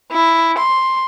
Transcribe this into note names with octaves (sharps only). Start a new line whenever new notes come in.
E4
C6